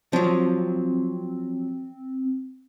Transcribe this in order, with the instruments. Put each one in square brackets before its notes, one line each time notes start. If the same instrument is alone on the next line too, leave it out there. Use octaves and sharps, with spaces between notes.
[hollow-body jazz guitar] F3 F#3 [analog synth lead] C4